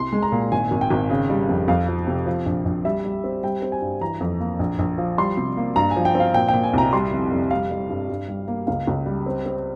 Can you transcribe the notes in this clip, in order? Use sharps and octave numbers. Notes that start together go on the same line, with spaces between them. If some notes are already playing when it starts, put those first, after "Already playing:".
Already playing: C2 C6
G#3
A#5
A#2
G#1 G#5
G#1
G5
G#1
C#3
G3
F2
F2 F5
F3
C3
F3
A#1
A#1
G3 E5
G3
C4
G3 G5
C4
G#5
G2
E3 A#5
F2
A#3
A#1
A#1
F3
G3 C6
C3
A#3
G2 A#5
G#5
F3
G5
C4 F5
A#2 G5
G5
A#2
G#5
C2 A#5
G3 C6
F1
F2
G3 F5
G3
G2
G2
G3
A#3
C#2 F5
C#2
G3
C4
C4